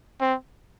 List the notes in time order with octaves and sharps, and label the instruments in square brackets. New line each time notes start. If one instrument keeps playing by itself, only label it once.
[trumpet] C4